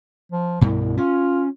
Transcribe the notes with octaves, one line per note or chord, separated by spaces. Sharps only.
F3
C2 G2 B2
C#4 F4